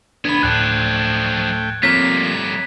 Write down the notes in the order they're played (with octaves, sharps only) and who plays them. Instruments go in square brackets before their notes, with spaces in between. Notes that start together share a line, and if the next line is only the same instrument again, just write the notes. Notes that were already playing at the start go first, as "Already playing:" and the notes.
[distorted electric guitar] D2 B3 [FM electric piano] D4 B5 [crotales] G#6
[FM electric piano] D2 A2 [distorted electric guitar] F3 D4 [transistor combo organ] A3 G5 [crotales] F#6
[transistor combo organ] F3 A#3 [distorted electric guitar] G3 A3 [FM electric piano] C4 C#5 A#5 [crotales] B6